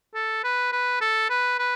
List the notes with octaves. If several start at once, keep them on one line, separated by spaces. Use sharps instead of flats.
A4
B4
B4
A4
B4
B4